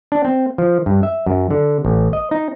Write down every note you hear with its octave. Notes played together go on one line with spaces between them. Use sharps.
D4
C4
F3
G2
E5
F#2
D3
A1
D#5
D#4